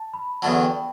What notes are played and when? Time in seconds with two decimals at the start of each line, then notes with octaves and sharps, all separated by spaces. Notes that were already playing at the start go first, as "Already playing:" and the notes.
Already playing: A5
0.13 B5
0.42 E2 D3 F#3 A5
0.62 G5